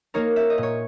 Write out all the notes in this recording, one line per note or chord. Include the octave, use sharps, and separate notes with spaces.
A#3 D#4 A#4 C#5
E5
D#5
A#2
C#5